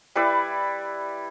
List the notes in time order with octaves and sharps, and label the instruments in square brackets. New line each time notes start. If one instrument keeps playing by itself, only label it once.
[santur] G3 E4 B4 D5